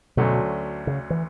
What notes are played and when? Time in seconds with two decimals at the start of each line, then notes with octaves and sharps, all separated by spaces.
0.17 D2 B2 D3 F#3 A3 C#4
0.87 C#3
1.10 E3